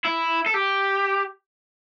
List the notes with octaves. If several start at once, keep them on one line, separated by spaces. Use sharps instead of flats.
E4
A4
G4